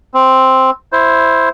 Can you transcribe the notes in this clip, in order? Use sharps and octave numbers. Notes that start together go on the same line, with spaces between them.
C4
E4 C5